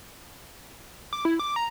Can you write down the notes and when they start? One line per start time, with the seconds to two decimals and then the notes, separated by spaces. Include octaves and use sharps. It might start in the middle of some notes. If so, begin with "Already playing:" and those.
1.13 D6
1.25 E4
1.39 D6
1.56 A#5